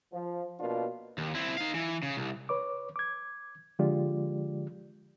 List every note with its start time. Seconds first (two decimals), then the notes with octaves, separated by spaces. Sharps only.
0.13 F3
0.60 B2 A#3 D4 F4
1.18 D#2
1.35 C4 E4
1.58 D#4 F5
1.75 E3
2.03 C#3
2.17 C2
2.49 B4 C#5 D6
2.96 D6 G#6
3.79 D3 F3 G#3 F4 G4 D5